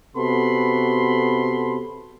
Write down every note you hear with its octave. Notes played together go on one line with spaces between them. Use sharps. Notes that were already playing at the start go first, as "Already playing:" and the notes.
C3 B3 F#4 A4 B5 C6